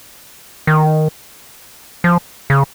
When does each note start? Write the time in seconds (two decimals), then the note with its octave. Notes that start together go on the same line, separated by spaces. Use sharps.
0.67 D#3
2.04 F3
2.50 C#3